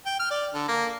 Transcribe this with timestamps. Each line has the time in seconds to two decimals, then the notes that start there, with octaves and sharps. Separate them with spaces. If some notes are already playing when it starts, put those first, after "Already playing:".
0.06 G5
0.19 F6
0.30 D5
0.54 D3
0.68 A#3